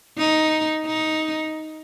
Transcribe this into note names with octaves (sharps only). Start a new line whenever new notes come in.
D#4
D#4